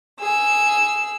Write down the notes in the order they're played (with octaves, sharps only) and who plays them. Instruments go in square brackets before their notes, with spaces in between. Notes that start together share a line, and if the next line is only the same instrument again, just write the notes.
[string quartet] G#4 E6